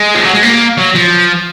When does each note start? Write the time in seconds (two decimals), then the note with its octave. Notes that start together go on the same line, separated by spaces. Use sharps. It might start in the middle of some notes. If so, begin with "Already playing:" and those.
Already playing: G#3
0.15 F3
0.24 F#3
0.33 G#3
0.43 A#3
0.77 F#3
0.95 F3